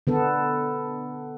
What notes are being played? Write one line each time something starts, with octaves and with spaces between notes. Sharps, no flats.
D3 B3 A4